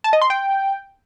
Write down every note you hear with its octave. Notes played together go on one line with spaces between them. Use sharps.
A5
D#5
C6
G5